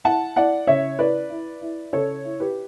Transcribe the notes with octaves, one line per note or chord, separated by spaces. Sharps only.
E4 F#5 A5
E4 D5 F#5
C#3 C#5 E5
E4 B4 D5
E4
E4
C#3 A4 C#5
E4
G4 B4